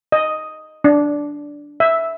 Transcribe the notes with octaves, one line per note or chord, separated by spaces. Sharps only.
D#5
D4
E5